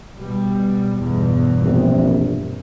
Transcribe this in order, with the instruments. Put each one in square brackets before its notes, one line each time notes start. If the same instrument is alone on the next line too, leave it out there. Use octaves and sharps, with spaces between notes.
[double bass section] B2 G3
G1 E2 B2
[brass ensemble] A#1 C3